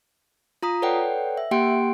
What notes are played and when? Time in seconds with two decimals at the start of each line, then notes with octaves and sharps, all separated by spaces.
0.63 F4 A#5 D#6 B6
0.82 A4 B4 C#5 D5 F#5 G5
1.37 E5
1.51 A#3 G4 F#5 G5 C6 D7